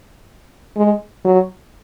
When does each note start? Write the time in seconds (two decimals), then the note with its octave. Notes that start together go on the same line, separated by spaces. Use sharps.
0.76 G#3
1.25 F#3